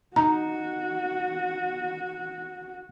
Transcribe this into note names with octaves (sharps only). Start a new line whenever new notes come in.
D#4 F#4 A#5